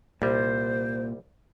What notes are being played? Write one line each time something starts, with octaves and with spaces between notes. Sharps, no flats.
C2 A#2 G3 C5